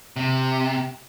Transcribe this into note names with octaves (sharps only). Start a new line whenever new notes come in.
C3